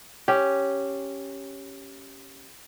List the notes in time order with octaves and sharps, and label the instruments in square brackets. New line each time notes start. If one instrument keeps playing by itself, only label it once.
[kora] C#4 G4